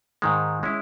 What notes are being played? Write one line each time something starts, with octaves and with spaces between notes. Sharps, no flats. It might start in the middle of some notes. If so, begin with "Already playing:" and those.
G#2 D#3 G#3
G#3 C#4 E4